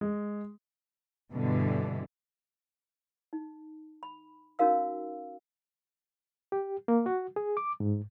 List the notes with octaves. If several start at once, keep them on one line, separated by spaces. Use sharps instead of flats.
G#3
G2 B2 D3 E3
D#4
B5
C#4 D#4 F#4 A#4 F5 E6
G4
A#3
F#4
G#4
D6
G#2